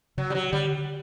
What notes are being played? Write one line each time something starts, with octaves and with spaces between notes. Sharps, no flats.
C#3 F#3
G3
F#3
D3 G3